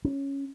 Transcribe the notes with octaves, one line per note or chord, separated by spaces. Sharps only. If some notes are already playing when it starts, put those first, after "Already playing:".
C#4